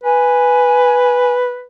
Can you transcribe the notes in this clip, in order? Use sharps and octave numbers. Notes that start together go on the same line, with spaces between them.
B4 G#5